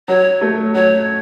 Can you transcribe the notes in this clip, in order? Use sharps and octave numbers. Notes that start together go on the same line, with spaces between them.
F#3 C#5
A3
F#3 C#5